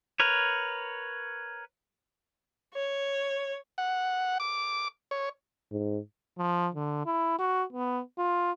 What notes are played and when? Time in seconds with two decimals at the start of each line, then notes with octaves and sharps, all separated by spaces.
0.20 A#4 B4 C#5
2.74 C#5
3.78 F#5
4.40 D6
5.11 C#5
5.72 G#2
6.38 F3
6.75 D3
7.06 E4
7.39 F#4
7.73 B3
8.18 F4